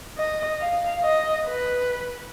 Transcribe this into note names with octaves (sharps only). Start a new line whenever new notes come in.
D#5
F5
D#5
B4